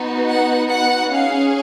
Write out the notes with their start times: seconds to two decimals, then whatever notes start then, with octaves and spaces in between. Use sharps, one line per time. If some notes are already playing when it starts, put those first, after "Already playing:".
Already playing: B3 D#4 F#4
0.28 F#5
0.69 F#5
1.11 C#4 G#4 F5